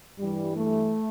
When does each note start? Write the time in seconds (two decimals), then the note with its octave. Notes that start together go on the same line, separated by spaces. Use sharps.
0.19 G2 E3 G3
0.57 A3